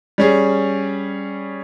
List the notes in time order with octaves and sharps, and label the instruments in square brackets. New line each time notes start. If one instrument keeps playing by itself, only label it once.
[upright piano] G3 C#4 G#4